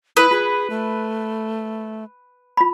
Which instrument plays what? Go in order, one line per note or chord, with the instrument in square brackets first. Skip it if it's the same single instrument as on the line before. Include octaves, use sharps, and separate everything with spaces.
[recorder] E4 [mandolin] B4 [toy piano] C#6 D#6
[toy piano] F4 [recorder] G#4
[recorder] A3
[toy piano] F4 B5